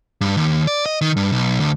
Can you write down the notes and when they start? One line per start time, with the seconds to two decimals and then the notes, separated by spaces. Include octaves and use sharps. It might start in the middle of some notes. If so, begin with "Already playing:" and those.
0.21 G2
0.37 D#2
0.67 D5
0.86 D#5
1.01 D#3
1.16 G2
1.32 B1
1.60 D2